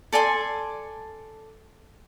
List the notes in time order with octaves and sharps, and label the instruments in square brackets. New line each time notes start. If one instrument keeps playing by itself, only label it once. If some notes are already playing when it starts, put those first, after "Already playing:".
[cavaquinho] A4 D5 G#5 C6